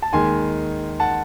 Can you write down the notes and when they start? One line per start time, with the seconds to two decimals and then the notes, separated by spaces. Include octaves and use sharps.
0.02 A5
0.13 D#2 D#3 G#3 G#5 C6
1.00 F#5 A5